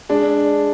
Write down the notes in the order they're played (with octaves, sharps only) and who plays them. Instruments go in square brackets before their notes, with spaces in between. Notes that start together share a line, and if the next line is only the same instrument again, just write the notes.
[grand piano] G#3 D4